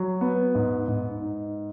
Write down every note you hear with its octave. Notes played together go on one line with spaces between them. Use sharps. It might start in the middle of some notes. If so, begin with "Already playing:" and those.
Already playing: F#3
B3
G#2
G#2
D#4